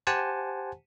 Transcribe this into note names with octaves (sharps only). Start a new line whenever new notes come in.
G4 C5 F#5 G#5 A5